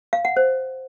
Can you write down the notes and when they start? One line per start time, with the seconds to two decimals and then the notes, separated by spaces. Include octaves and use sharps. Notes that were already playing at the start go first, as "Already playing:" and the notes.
0.13 F5
0.25 F#5
0.37 C5